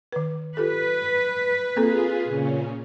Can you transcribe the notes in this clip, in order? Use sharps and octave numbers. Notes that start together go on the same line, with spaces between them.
D#3 B4
F4 G4 A4 B4
A#3 C4 F4 G#4 A4
A#2 C#3 C#4